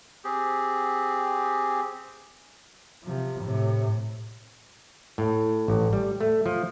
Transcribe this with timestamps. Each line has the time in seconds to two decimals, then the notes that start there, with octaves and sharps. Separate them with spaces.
0.24 C4 G4 G#4
3.04 C3 F3
3.42 A2 C3
5.18 A2
5.68 A1
5.93 G3
6.21 A3
6.46 F3